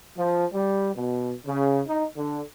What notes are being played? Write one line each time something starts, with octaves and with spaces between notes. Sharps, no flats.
F3
G3
B2
C#3
D#4
D3